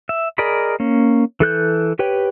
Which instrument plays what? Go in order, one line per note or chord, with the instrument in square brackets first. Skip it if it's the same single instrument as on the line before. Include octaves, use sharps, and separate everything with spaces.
[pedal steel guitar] E5
G#4 A#4 D5 D#5 B5
A#3 C#4
E3 A4 F#6 G6
G4 B4 C#5 G5